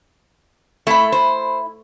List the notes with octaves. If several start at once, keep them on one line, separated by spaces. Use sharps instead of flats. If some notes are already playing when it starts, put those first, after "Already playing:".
A3 E4 B5
C5